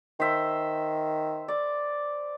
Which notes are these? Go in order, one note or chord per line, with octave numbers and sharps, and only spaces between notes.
D#3 C5 E5
D5